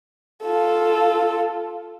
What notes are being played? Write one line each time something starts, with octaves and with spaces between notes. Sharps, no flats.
F4 A4